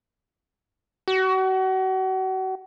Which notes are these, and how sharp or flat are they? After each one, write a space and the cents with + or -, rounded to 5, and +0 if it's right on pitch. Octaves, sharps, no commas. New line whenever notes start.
F#4 +35